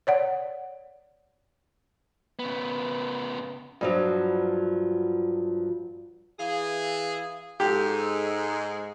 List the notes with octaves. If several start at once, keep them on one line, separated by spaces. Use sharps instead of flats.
C#5 D5 F#5
C#3 B3
G2 F3 F#3
E3 G#4 F5
G#2 G#3 G4 A4